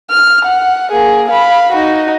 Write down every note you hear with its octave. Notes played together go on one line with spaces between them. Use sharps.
F6
F#5
A#3 G#4
F5 B5
D#4 F#4